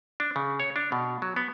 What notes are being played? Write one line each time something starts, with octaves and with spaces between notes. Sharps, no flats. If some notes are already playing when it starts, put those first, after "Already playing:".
D4
C#3
C#5
D4
B2
F#3
B3